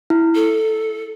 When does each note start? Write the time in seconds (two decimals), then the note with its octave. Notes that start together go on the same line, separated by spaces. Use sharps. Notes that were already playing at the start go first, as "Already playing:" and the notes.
0.10 E4
0.35 A4